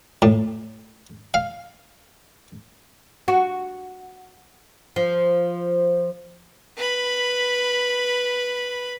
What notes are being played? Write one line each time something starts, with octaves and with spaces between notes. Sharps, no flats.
A2
F5
F#4
F3
B4 B5